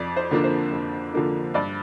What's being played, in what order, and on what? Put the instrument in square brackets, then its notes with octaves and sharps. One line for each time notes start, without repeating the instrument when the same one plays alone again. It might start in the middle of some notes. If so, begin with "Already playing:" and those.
Already playing: [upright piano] F2 D5
C5
D3 F3 A#3 D4
C5
F2
D3 F3 A#3 D4
G2 D5